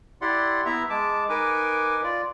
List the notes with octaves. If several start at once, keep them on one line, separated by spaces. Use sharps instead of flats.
E4 G4 D5 F#5 C6
B3 E4 E5 A#5
G#3 A5 D6
D#4 A#4 B4 G#5 D6
F4 D5